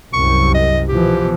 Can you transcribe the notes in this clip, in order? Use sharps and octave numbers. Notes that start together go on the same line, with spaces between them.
C2 F#2 C3 C#6
D#5
B2 E3 F3 G4